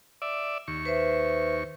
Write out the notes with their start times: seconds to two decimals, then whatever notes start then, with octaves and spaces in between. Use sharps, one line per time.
0.22 D5 E5
0.68 D#2 C#6
0.85 B4 C5 E5